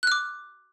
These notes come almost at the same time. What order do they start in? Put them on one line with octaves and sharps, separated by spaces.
F#6 F6 D6